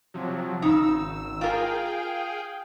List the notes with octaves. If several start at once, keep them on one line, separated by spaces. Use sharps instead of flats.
C3 F3 F#3
G#1 C#3 D#4 E6
F4 G#4 A#4 F5 G5